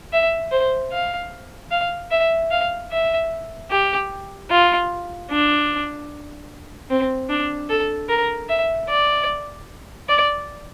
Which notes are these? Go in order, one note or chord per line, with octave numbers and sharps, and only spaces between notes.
E5
C5
F5
F5
E5
F5
E5
G4
F4
D4
C4
D4
A4
A#4
E5
D5
D5